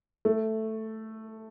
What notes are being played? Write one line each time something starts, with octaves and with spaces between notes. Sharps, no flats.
A3